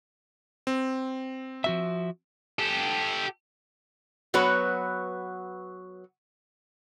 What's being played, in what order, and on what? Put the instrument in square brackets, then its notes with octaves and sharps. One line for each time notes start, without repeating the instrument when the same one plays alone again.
[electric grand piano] C4
[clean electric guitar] F3 F#4 E5
[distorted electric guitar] G4 A4
[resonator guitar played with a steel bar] F#3 B3 F#4 B4 C#5